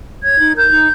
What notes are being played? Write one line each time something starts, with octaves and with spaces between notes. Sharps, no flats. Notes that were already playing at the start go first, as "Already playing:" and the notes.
C#5 G#6
D#4
A#4 G6
D#4